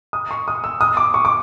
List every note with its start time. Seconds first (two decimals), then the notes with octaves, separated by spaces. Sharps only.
0.13 D#6
0.31 C#6
0.48 D#6
0.64 E6
0.81 D#6
0.97 D6
1.14 C#6
1.25 D6